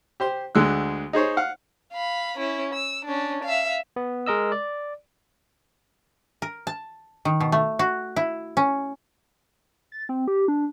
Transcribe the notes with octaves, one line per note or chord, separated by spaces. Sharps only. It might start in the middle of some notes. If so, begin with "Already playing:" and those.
G4 C5 C6
D2 D3 G#3 E6 F#6
D#4 G#4 C5 C#5
F5 F#5
F5 B5
C#4 E4
E6
C#4 D4
E5 F5
B3
G#3 A#4 D#5 E6
D5
A#4
A5
D#3
B2
A3
F#4
E4
C#4
A6
C4
G4
D4